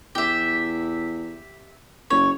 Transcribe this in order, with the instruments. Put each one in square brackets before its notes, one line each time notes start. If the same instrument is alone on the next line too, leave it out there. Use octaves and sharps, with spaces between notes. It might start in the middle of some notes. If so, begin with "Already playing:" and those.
[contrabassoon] E2 [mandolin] G4 E5
[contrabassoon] F#1 [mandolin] C#5